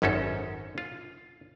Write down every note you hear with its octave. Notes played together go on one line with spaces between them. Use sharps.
G#1 F#2 C#4 D#4 A4
F4